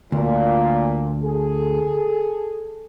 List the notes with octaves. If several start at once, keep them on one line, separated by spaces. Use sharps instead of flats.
D2 A#2
G#4 A4